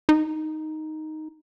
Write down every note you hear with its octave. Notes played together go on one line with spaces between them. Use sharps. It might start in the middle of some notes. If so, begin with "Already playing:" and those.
D#4